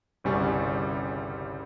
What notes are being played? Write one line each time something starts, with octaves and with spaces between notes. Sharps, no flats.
G1 C2 C#3 G3 G#5 C#6